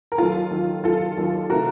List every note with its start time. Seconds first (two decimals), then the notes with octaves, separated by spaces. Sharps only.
0.12 A#4
0.18 D#2 D#3 F#3 F4 A4
0.51 D#2 D#3 F#3
0.84 D#2 D#3 F#3 F4 A4
1.17 D#2 D#3 F#3
1.50 C3 D#3 A3 F#4 A#4